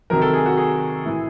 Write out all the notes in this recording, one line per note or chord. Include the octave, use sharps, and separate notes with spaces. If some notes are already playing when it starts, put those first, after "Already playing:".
C3 D#3 F#3 A#4
A4
G#4
F#4
G#4
A2 E3